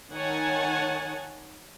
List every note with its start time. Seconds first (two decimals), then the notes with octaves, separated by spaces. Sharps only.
0.12 D#3 C#5 F#5 G#5 A5